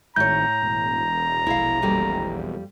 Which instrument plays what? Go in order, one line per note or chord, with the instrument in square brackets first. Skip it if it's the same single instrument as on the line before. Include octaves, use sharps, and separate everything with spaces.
[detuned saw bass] G#1 [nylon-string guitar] A2 C#5 [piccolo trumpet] A#5 [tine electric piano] G6
[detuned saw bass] E1
[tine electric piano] A#1 [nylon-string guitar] E4 F5
[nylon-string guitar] F2 G3 A#3